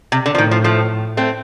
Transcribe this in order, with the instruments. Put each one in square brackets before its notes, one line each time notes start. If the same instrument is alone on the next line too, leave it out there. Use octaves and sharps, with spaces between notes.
[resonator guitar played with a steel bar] C3
D3
F3
[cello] A2 [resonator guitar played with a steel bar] D#3
[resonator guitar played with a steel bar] F3
F3 A3
A3 C4